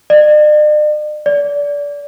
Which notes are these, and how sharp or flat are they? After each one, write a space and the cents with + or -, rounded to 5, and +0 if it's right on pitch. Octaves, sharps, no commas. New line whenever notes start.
D5 +45
D5 -25